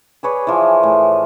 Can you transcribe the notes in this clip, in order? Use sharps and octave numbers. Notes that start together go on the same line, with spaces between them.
G#4 B4 C#5 D5
E3 F3
A2